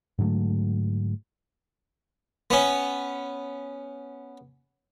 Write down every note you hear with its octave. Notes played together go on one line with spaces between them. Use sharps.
G#2 D3 F#3 A3
B3 C#4